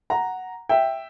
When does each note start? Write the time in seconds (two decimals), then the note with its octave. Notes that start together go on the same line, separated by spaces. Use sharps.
0.10 F#5 A#5
0.69 E5 G5